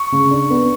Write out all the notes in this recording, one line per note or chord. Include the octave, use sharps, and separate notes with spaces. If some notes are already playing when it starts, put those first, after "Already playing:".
Already playing: C#6
C#3
D4
B3